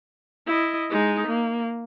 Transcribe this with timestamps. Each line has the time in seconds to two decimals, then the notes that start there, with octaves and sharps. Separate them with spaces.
0.47 E4 D#5
0.90 G#3 D#4
1.27 A#3